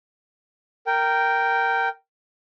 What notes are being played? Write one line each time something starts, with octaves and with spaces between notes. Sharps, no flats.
A#4 G5